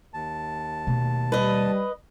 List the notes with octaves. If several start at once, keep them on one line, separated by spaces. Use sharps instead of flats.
D#2 A5
B2 A3
G3 B4 D#5